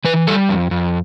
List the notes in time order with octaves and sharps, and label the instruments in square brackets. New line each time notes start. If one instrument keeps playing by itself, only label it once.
[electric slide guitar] E3 B4
G3 A4
F2
F2